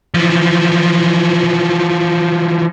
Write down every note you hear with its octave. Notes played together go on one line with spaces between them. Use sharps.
E3 F3